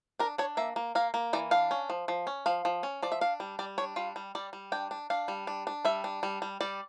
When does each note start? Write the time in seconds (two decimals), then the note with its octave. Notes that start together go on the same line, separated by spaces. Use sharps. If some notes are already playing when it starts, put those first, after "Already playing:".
0.19 D4 A#4
0.38 D4 C#5
0.57 A#3 E5
0.76 A#3
0.95 A#3 F5
1.14 A#3
1.33 E3 D5
1.51 D4 F5
1.71 C#4
1.90 F3
2.08 F3
2.27 C#4
2.46 F3 F5
2.65 F3
2.83 C#4
3.02 F3 D5
3.12 E5
3.21 D4 F5
3.40 G3
3.59 G3 D5
3.78 D4 C#5
3.96 G3 F4
4.16 G3
4.35 G3 D5
4.53 G3
4.72 D4 G5
4.91 D4
5.10 D4 F5
5.28 G3
5.47 D4
5.67 D4
5.85 G3 E5
6.04 D4
6.23 G3
6.42 G3
6.61 G3 D5